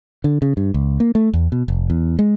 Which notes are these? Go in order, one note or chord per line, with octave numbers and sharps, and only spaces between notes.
D3
C#3
G2
C#2
A#3
A3
E2
B2
F1
E2
G#3